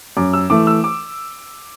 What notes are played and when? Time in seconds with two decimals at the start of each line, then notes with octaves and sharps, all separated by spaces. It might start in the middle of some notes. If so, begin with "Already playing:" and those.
0.17 F#2 D6
0.33 E6
0.50 E3 A3 D6
0.67 E6
0.84 D6